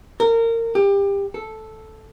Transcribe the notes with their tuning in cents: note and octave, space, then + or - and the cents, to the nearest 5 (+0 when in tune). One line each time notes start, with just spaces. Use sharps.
A#4 -25
G4 +25
A4 -5